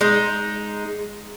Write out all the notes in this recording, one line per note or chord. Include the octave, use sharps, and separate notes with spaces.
G#3 D#4